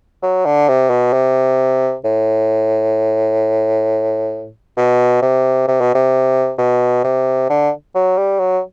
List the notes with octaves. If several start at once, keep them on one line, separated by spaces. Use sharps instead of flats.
F#3
D3
C3
B2
C3
A2
B2
C3
C3
B2
C3
B2
C3
D3
F#3
G3
F#3